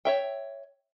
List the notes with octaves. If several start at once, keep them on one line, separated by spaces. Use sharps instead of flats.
C#5 E5 G5